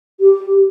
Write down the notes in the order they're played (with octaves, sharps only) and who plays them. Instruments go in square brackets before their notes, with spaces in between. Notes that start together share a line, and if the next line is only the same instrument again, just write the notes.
[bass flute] G4